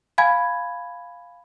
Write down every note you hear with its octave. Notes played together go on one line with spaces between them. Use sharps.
F5 G#5 B5 G#6